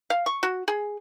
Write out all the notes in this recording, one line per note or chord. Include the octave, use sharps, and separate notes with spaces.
F5
C#6
F#4
G#4